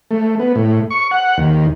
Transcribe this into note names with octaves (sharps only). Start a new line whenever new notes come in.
A3
B3
A2
C#6
F#5
D#2